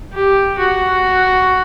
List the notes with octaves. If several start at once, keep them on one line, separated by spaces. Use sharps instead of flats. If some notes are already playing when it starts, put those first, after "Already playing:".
G4
F#4